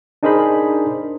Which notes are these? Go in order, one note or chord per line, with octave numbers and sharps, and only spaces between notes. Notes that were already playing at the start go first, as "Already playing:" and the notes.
D4 D#4 G#4 A#4 C5 B5